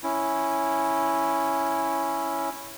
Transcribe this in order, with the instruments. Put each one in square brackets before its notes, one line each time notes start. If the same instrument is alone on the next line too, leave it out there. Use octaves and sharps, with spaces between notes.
[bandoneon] C#4 E4